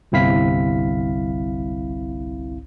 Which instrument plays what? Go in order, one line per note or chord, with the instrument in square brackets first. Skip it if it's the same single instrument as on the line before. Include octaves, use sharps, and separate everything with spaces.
[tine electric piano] G1 C2 C4 E4 F5 B6